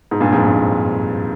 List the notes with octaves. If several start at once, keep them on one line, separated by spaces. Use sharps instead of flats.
G#2
G2 A#2
F2 G#2
G2